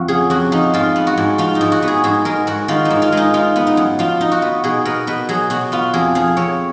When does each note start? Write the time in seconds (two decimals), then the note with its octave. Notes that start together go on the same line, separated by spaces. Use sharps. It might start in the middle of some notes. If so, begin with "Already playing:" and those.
Already playing: F2 F3 F#4
0.08 C#3 G#4
0.30 F2 F#4
0.52 F3 D#4
0.74 G#2 F4
0.96 B3
1.07 F#4
1.17 G#2
1.38 F3 F4
1.55 D#4
1.61 G#2
1.72 F#4
1.82 B3
1.88 G#4
2.04 G#2 G#4
2.25 G#3 A#4
2.47 G#2 F#4
2.68 D#3 F4
2.85 D#4
2.91 G#2
3.02 F4
3.12 G#3 D#4
3.34 D#4 F4
3.56 B3
3.67 D#4
3.77 F#2
3.99 F3 F4
4.21 D#4
4.32 F#4
4.42 B3
4.64 B2 G#4
4.85 B3 A#4
5.07 B2 B4
5.29 F#3 G#4
5.50 B2 F#4
5.72 B3 F4
5.93 F2 G#4
6.15 F3 G#4
6.37 F2 C#5